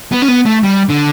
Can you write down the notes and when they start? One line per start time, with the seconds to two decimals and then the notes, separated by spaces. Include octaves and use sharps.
0.12 B3
0.22 C#4
0.28 B3
0.46 A3
0.64 G3
0.89 D3